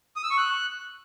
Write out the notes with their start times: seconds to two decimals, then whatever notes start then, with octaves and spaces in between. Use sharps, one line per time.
0.16 D#6
0.23 E6
0.30 C#6
0.37 F#6